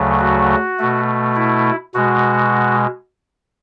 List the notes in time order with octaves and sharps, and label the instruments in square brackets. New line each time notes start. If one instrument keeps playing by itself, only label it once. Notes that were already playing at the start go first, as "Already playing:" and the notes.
Already playing: [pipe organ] D2 C#3 F#3 A3
F#4
B2 A3
E4
B2 G#3 F#4